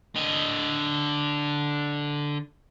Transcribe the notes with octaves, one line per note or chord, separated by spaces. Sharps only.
D3 D#5